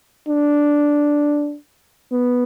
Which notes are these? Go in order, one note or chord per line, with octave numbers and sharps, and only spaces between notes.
D4
B3